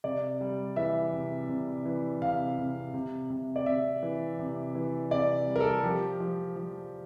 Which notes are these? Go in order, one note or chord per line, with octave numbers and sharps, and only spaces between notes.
C3 D5
G3
E3 E5
C3
C3
E3
C3 F5
C3
C3
C3
D5
C3 E5
E3
C3
E3
C3 D5
G3
A#4
A4
F3 G4
F3
F3